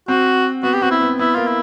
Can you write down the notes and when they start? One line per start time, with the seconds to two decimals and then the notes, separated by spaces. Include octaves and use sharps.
0.08 C4 F#4
0.63 B3 F#4
0.73 G4
0.82 C4 F#4
0.91 E4
1.01 B3
1.19 B3 E4
1.35 A#3 F4
1.47 E4